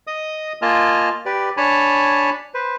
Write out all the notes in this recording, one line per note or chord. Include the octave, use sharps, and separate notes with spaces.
D#5 D#6
A#3 F4 D#5 G#5 A5 F6
G4 B4 D5
D4 C#5 G#5 A5 B5
B4 C5